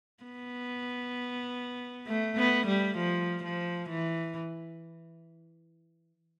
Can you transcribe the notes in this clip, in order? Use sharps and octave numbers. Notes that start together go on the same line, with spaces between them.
B3
A3
B3
G3
F3
F3
E3